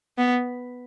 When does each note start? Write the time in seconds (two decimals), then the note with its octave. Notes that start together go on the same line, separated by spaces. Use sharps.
0.18 B3